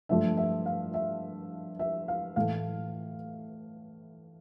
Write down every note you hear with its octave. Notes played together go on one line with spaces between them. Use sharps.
G2 F3 A3 E5
E5
F5
E5
E5
F5
A2 E3 A3 F5